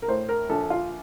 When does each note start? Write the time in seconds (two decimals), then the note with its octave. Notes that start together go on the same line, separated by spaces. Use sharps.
0.02 A#4
0.08 A2 C5
0.29 A#4
0.49 A#1 A4
0.70 F4